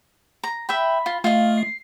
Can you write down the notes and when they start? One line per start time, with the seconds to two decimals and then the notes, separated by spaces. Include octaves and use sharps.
0.43 A#5
0.69 E5 G5 B5
1.06 F4
1.24 A3 F4 D#5 F5
1.57 C7